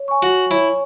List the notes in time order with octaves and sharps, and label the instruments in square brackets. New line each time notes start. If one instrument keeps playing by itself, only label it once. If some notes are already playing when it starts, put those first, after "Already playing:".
Already playing: [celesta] C#5
G#5 C#6
[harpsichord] F#4
[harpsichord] E4 [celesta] C#5